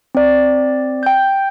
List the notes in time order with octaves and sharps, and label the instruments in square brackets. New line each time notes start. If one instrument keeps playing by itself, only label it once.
[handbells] C4 D5
G5 G6